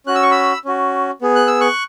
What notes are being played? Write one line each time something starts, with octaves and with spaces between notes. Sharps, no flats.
C#4 F#4 F#6
E6
C#6
B5 E6
C#4 F#4
B3 G#4
F#6
E6
C#6 F#6